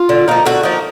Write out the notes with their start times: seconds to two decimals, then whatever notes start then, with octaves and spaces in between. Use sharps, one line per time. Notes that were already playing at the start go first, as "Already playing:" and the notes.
Already playing: F4
0.09 D3
0.28 F3 A#3 D#4
0.45 D3 F#4
0.63 F3 A#3 D#4